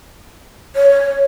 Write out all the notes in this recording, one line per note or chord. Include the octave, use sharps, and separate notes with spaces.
C#5